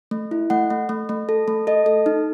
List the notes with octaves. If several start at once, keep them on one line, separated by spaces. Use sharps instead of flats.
A3
E4
A3 F#5
A3
A3
A3
A4
A3
A4 D#5
A4
D#4